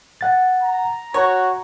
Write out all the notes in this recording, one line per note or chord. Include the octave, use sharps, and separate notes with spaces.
F#5 A6
A#5
F#4 C#5 A#5